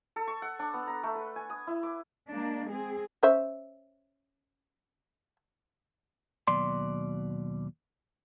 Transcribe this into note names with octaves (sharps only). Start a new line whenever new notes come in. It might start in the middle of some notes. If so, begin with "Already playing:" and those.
A4
C#6
F#5
D4
B3
A#5
A3
B4
G#5
D#6
E4
D6
G#3 A#3 D4
C4 G#4
C#4 C5 E5
D#2 B2 F#3 D5 C6